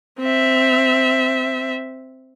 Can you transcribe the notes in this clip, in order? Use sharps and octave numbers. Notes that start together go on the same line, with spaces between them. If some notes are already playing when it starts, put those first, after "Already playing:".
C4 E5